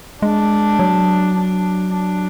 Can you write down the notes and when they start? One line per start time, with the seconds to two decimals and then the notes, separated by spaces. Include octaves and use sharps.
0.22 G#3 D4
0.79 F#3
1.37 D4
1.94 D4